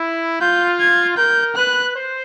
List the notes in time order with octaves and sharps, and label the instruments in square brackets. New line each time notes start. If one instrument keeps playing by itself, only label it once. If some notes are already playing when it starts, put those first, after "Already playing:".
Already playing: [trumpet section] E4
[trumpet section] F4 [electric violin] G6
[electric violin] G#6
[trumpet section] A#4 [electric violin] G6
[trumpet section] B4 [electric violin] F#6
[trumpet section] C5